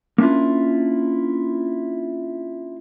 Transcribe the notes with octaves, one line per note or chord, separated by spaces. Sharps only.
A#3 C#4 D4 E4 F4